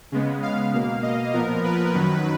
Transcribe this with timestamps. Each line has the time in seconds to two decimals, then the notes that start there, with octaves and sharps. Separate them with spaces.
0.12 C#3 G#3 B3
0.43 F5
0.73 B2 A#3
1.03 D#5
1.33 A#2 F3 B3 A#4
1.64 B4
1.94 F#2 D#3 F#3